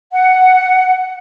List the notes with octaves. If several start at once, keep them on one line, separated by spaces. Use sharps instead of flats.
F#5